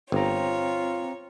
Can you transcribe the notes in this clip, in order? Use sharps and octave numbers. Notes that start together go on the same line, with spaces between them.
G1 C4 F4 C#5 A#5